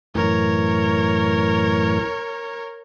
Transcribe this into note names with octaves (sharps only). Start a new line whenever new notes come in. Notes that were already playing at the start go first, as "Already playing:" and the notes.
F#2 A2 E3 A#4 C#5